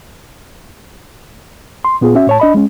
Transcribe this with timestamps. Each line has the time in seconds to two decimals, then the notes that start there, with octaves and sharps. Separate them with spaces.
1.85 C6
2.01 A#2 B3 F4 G#4
2.15 C#4 F#4 E5
2.27 A2 C#5 A5
2.40 D4 D#5 B5
2.54 G#3 C#4